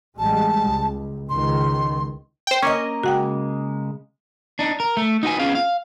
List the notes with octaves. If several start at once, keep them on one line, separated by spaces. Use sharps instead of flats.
A1 G3 G#3 A5
C#2
C#2 D#3 C6
C5 G5
A#3 C#4 A#4 D#5
C#3 G#3 F#4 F#5 G5
D4 D#4
A#4
A3
D#4 F#4 B4 G#5
B3 C#4 F4 G#4 F5
F5